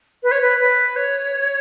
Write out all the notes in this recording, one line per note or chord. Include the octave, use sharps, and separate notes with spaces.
B4
C#5
B4
B4
C#5